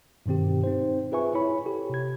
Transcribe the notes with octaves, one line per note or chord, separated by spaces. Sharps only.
G2 B2 D#3 C4 G4
C4 D#4 C5
F4 G#4 B4 E5 G#5 C#6
E4 C#5 B5
G4 A4
C3 G#6